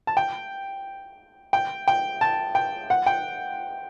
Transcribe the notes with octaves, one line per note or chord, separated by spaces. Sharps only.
A5
G5
G5
G5
A5
G5
F#5
G5